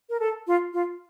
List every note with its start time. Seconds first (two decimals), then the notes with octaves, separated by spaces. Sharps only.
0.10 A#4
0.20 A4
0.47 F4
0.73 F4